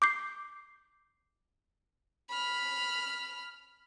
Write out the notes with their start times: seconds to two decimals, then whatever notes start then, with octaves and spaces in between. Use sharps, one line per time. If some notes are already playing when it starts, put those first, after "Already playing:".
0.02 D6 G6 C7
2.30 B5 F6